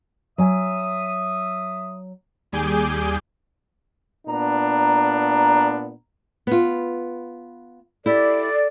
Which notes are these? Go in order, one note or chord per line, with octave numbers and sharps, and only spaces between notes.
F#3 E5 G#5 D#6
D#2 G3 G#4 G#5 D6 G6
A#2 B3 D4 A#5
B3 F4
E4 G4 A4 D5